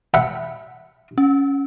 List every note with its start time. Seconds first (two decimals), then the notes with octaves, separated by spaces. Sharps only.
0.14 E5 F#5 B5
1.18 C#4